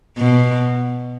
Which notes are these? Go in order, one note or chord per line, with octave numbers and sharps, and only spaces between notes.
B2